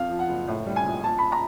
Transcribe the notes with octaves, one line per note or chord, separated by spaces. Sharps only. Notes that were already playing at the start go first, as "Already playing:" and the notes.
Already playing: F2 F5
F3
F#5
F#1
A2
G3
G#5
A#1
A#2 A5
B5
A#5